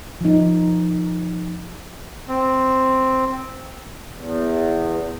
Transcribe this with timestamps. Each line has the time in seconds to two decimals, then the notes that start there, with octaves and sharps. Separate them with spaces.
0.21 F3 D#4
2.28 C4
4.14 E2